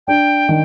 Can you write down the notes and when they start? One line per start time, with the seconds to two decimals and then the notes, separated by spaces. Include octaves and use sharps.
0.07 D4 G5
0.49 D#3